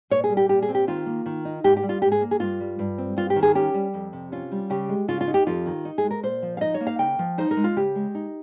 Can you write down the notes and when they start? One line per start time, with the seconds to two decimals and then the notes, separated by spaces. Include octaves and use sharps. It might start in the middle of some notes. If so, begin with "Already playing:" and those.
0.10 A#2 C#5
0.24 G#4
0.30 G3
0.37 G4
0.49 A#2 G4
0.62 G#4
0.68 C4
0.75 G4
0.88 D#3 F4
1.06 A#3
1.26 D#3
1.45 D#4
1.64 G#2 G4
1.77 G4
1.83 G3
1.89 F4
2.02 G#2 G4
2.12 G#4
2.21 A#3
2.31 G#4
2.40 G2 F4
2.60 G3
2.79 G2
2.98 C4
3.17 G2 F4
3.30 G4
3.36 D#3
3.43 G#4
3.55 C#4 G4
3.74 G3
3.94 F2
4.13 C3
4.32 C#4 F4
4.52 G3
4.70 C#3 G4
4.89 G#3
5.08 C#3 F4
5.21 F4
5.27 D#4
5.34 G4
5.47 F2 F4
5.66 D#3
5.85 D#4
5.98 G#4
6.04 G#3
6.11 A#4
6.23 A#2 C5
6.42 F3
6.57 F5
6.61 D#4 D#5
6.74 C#5
6.81 A#3
6.87 F5
6.99 C#3 G5
7.19 F3
7.38 D#4 C5
7.51 A#4
7.57 G#3
7.64 F4
7.76 C#3 G4
7.95 G#3
8.15 D#4